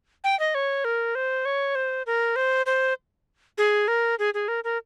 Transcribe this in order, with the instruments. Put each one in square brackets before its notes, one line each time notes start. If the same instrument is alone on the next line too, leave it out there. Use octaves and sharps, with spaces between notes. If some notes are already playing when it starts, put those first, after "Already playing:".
[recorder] G5
D#5
C#5
A#4
C5
C#5
C5
A#4
C5
C5
G#4
A#4
G#4
G#4
A#4
A#4